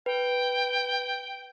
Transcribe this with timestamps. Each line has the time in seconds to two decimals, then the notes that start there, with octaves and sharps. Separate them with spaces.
0.06 B4 G5